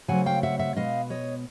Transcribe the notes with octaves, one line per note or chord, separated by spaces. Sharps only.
C#3 F#3 A3 C4 F#5 G#5
F5 G5
E5 F#5
E5 F#5
B2 G#3 B3 D#5 F5
C#5 D#5